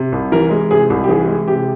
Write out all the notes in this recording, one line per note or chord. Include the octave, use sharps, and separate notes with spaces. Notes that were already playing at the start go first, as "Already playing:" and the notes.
Already playing: C3
C2
E3 A#4
G#3
C3 G#4
C2
G4
E3 G#4
G#3
C3 G4